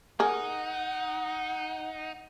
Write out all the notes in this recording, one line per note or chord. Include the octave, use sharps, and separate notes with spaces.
D#4 G#4 A#4 F#5